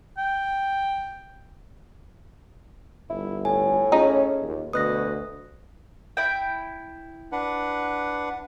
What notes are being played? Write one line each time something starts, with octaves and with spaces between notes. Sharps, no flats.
G5
G1 E4
A2 G#5
C#4 D#4 F4 G#4 A4
D#2
D2 B2 D#6 F#6 A#6
E4 G5
D4 B4 F#5